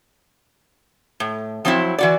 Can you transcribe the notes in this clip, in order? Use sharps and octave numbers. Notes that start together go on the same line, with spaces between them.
A2
F3 F#3 C4 D#4 E4
E3 F#4 D5